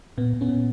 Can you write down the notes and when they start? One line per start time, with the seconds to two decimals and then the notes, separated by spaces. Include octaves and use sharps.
0.18 A#2 B3
0.33 A#2
0.41 B3 C#4
0.49 A#2